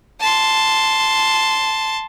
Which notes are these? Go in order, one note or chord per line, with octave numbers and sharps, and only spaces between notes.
A5 C6